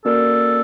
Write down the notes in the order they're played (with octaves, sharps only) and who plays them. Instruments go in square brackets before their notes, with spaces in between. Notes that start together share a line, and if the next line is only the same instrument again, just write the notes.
[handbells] A#3 C#4 F#4 A#4 D5 [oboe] A4